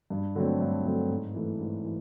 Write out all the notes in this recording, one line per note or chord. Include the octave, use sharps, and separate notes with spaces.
G2
D3 F#3 A3 C4
G2
D3 F#3 A3 C4
G#2
E3 A3
G#2
E3